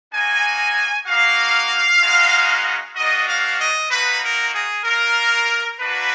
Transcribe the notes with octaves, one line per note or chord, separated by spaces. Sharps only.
A#3 D#4 F#4 G#5
A#3 D#4 F#4 F5
G#3 B3 D#4 F#4
A#3 D4 F#4 D#5
F5
D#5
A#3 D#4 F#4 B4
A#4
G#4
A#3 F4 A#4
A#3 D4 F#4 B4